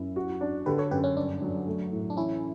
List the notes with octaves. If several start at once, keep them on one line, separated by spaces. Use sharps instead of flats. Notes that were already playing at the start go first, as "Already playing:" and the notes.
Already playing: F#2 E4
F#4
D4
D3 G4 B4
A4 C#5
F#2 G4 B4
C#4
G2 D4
F#3
A3
A2
D4
E3 C#4 E4